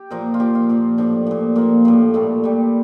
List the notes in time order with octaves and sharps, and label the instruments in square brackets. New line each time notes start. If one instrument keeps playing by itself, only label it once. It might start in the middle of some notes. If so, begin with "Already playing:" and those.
Already playing: [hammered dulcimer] G4
A#2 F3 A#4
F4
A#2 F3 G4
F4
A#2 F3
A2 F3 D4
A#2 F3
A#2 F3 A#3
A2 F3 A3
A#2 G3 A3
A#2 G3